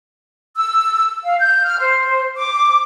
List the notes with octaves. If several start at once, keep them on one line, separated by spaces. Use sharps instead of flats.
E6
F5
G6
F6
C5
D6